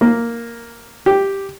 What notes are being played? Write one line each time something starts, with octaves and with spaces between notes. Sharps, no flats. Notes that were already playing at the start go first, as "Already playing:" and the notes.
A#3
G4